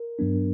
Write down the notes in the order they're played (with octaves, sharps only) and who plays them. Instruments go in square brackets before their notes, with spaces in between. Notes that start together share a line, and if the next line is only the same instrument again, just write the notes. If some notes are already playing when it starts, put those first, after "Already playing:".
Already playing: [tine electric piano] A#4
G2 F#3 B3 D4